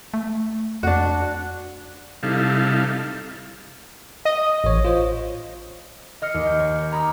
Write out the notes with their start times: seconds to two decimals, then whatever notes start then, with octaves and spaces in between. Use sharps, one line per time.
0.14 A3
0.83 F2 D4 F#4
2.23 C3 G3 D#4 E4 A4 F5
4.25 D#5
4.64 A1 C#5
4.85 F4 C5
6.22 D#5 F6 C7 C#7
6.34 D#2
6.47 G6
6.59 C#5
6.78 G6
6.92 G#5 A#5 B5 D6 D#6 F6